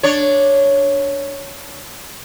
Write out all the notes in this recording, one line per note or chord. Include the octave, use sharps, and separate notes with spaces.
D4 C#5